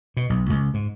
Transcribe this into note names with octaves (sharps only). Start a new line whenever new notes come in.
B2
B1
C#2
G#2